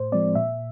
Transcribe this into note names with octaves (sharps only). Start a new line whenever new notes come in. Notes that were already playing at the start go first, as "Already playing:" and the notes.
Already playing: A2 C5
F3 G#3 C4 D5
A#2 E5